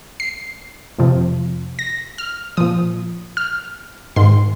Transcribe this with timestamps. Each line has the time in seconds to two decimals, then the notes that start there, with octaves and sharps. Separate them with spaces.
0.20 C7
0.98 F2 C3 F3
1.79 A#6
2.18 F6
2.57 A#2 F3 D#6
3.37 F6
4.16 G#2 D#3 C6